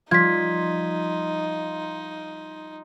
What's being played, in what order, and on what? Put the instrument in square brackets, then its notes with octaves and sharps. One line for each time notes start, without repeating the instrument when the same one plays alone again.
[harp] F3 G3 D5 [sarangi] D#4 [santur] F4 [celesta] G#6 B6